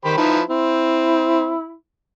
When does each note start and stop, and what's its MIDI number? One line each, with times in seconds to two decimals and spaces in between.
0.05 0.14 51
0.05 0.15 67
0.05 0.15 72
0.05 0.15 83
0.17 0.41 53
0.17 0.40 63
0.17 0.41 64
0.17 0.41 71
0.50 1.55 60
0.50 1.75 64